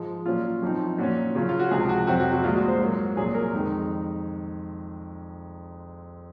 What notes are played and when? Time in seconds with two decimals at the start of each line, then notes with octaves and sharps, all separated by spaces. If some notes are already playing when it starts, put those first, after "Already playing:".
Already playing: G#2 F3 G#3
0.26 A#2 F#3 C#4 F4
0.62 F#2 F3 C4 D#4
0.98 A#2 F#3 C#4 F#4
1.35 C#3 F#3 C#4 F4
1.49 F4
1.59 F#4
1.71 C#2 C3 F3 G#4
1.89 F#4
2.07 F2 C3 F#3 C4 F#4
2.20 F#4
2.32 F#4
2.44 C2 A#2 G#3 F4
2.56 F#4
2.68 C5
2.80 G#2 F#3 A#3
3.16 C2 A#2 F#3 G#4
3.35 A#4
3.53 F2 D#3 G#3 D#4